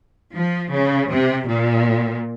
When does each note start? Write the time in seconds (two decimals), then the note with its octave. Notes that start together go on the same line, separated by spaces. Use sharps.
0.35 F3
0.72 C#3
1.10 C3
1.48 A#2